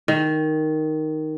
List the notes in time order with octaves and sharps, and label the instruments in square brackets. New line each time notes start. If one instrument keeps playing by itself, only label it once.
[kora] D#3